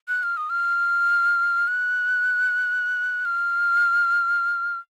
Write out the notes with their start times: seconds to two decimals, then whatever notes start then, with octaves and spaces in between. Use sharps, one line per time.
0.08 F#6
0.23 F6
0.37 D#6
0.50 F6
1.68 F#6
3.25 F6